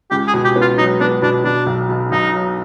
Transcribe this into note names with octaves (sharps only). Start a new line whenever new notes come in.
C#2 G4
G#4
B2
G4
B3
F4
F#3 D#4
B3 D4
B2 D4
B2 D4
B1
B2
B1 D#4
F#3